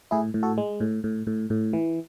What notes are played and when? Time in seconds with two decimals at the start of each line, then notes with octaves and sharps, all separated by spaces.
0.11 A2 E4 G#4
0.34 A2
0.43 F#4 A4
0.58 G#3
0.80 A2
1.04 A2
1.27 A2
1.50 A2
1.73 E3